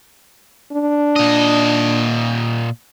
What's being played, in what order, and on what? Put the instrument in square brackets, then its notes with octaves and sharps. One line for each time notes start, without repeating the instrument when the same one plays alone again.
[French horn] D4
[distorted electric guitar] A#2 D#5